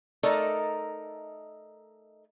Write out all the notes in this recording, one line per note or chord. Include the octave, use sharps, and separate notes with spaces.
A3 D#4 A4 A#4 D5 D#5